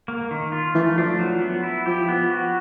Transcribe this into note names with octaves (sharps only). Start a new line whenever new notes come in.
A#3
D#3
F4
E3 A3
F3 D4
F#3
B3
E4
F3 G4
B3
F#4